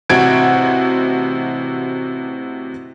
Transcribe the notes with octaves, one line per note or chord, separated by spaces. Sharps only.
A1 C3 F#4 G#6 D7